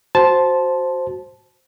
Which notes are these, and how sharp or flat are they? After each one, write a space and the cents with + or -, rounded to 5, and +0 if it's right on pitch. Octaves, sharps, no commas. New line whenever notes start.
F#4 +0 C5 +0 A5 -10